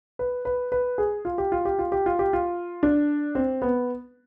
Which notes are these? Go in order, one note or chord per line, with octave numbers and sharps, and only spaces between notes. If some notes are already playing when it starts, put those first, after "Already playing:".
B4
B4
B4
G#4
F4
G4
F4
G4
F4
G4
F4
G4
F4
D4
C4
B3